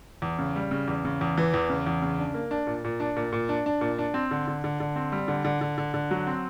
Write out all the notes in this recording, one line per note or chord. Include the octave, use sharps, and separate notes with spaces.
E2
C#3
G3
C#3
E2
C#3
E2
E3
E2
C#3
E2
C#3
D4
A#3
D4
A#2
A#2
D4
A#2
A#2
D4
D4
A#2
D4
C4
D3
D3
D3
D3
C4
G3
D3
D3
D3
D3
D3
F#3
C4